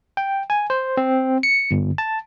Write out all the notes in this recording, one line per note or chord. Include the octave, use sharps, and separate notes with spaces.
G5
G#5
C5
C4
C#7
G1
A5